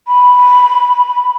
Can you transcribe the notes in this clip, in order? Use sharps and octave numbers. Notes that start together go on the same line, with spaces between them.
B5